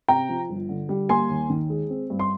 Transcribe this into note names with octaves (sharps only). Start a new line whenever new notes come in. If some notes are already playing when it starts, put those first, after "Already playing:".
C3 G5 A#5
F3
G1
D3
G3
A#3 G#5 C6
D#2
D#3
G#3
C4
G2
C6